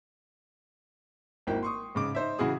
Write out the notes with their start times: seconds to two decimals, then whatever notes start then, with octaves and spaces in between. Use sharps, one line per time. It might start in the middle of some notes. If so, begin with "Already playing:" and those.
1.47 G#1 A#3 E4 G5
1.63 C6 C#6 D#6
1.95 G#2 C#3 D6
2.15 D#4 C5 E5
2.39 C#3 E3 E4 F#4 G#4 D#6